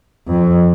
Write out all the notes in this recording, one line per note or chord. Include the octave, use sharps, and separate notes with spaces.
F2